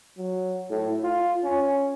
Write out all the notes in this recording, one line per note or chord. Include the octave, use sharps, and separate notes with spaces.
F#3
A2
F4
C#4